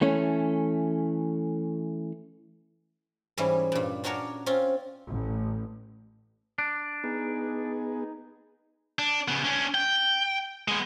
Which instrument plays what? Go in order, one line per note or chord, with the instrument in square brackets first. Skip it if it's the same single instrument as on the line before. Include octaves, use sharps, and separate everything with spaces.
[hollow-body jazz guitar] E3 A3 C#4
[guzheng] G#2 E3 G3 C#4
G2 A#2
C#4 D4 F#4 A#4 C#5
C4 C#4 F4
[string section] A1
[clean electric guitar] D4
[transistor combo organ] B3 G#4 [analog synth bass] D#4
[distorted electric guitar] D4
C#3 B3
C#4 D4
G5
G#3 B3